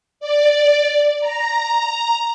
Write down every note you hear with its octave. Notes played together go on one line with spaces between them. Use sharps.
D5
A#5